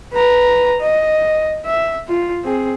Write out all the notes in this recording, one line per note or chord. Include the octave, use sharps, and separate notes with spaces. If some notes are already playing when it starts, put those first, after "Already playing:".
B4 A#5
D#5
E5
F4
C4 G#4